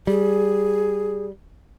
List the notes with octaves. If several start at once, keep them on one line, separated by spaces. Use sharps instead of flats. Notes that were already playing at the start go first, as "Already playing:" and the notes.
G3 G#4